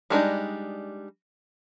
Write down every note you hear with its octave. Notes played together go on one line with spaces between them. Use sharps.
G3 G#3 D4 D#4